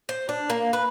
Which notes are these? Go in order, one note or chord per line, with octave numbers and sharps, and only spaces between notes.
C5
D4
A#3
B4